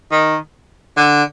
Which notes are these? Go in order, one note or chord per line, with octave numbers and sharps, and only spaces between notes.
D#3
D3